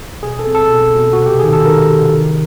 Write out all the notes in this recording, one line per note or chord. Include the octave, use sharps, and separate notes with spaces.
B2 G#4
A4
C4
A4
B2
B2
F#4
C3
G4
D#3 G#4
A4
D#3 A#4
C3
D#3